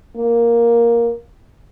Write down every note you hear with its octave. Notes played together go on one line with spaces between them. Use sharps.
A#3